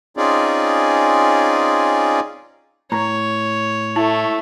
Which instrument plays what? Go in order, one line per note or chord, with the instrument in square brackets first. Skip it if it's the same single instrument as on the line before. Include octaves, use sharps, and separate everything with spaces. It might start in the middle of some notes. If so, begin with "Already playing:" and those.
[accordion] C4 C#4 D#4 F4 G#4 D5
[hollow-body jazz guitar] A2 A#5 [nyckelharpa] C#5
[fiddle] A3 [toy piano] E4